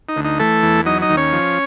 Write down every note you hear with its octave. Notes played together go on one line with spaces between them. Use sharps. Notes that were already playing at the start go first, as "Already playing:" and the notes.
D#4
D2
D#4
E3 A3 A4
E2
F#3 D#4 D#5
D#4 D#5
D#2
C#4 C#5
F3